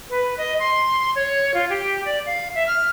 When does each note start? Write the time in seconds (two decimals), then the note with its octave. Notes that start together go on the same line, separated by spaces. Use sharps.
0.10 B4
0.38 D#5
0.59 C6
1.15 C#5
1.54 F4
1.70 G4
2.05 D5
2.26 F5
2.55 E5
2.67 F6